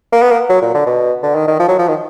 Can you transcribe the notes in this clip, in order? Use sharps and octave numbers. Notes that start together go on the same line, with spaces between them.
A#3
B3
A#3
F#3
A#2
D3
B2
D3
D#3
D#3
F3
F#3
F3
D#3